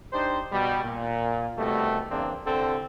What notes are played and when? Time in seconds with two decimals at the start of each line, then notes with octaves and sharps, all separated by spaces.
0.13 D4 D#4 G4 C5
0.51 B2 G3
0.82 A#2
1.57 C2 B2 G3 A3
2.10 E2 C#3 A#3 C4 D4
2.46 C2 D3 C4 A4